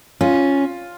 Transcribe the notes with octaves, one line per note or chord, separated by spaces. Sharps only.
C#4 F4